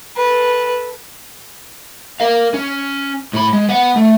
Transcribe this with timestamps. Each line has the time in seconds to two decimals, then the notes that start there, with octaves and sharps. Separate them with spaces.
0.17 A4 B4
2.20 A#4 F5
2.54 C#4
3.33 A2 B5
3.53 G#3
3.69 B3 F#5
3.96 A3